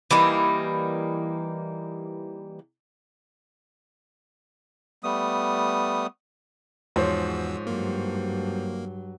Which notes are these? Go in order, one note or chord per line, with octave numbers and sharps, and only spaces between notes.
E3 G3 A#3 D#4
G3 A3 B3 D#6
E2 G#2 F3 F#4 C5 C#5 E6
G2 F#3 A#3